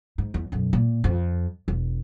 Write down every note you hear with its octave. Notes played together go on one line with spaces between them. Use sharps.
G#2
E2
B1 F#2
A#2
F2
E1